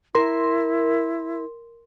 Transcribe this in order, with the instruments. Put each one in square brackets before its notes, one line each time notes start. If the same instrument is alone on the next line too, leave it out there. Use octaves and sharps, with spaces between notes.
[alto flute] E4 [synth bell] A#4 C6